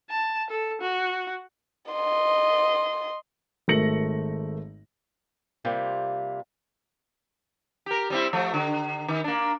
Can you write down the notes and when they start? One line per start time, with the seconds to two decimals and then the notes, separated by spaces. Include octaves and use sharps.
0.10 A5
0.50 A4
0.81 F#4
1.91 D#5 C6
3.68 G#1 A3 A#4 A#6 C#7 F#7
5.65 C3 G3 A#3 F4
7.86 G4 A#4
8.10 G3 C4 E4
8.33 F3 A3
8.54 D3
9.08 D#3
9.24 A#3 D4